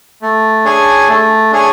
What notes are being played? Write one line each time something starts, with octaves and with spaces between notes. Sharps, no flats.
A3
D4 G#4 C#5 G#5
A3
D4 G#4 C#5 G#5